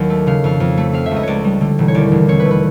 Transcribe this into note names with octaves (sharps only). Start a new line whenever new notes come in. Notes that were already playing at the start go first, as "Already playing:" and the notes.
Already playing: D#2 F#3
A3
C#3 F5
F2 F5
F2
A3
C4 F5
E5
C#2
D#5
C#2 C#5 D5
G3
D3
E1
C#5
D#2 D5
E1
C4 C#5
B4
A3
B4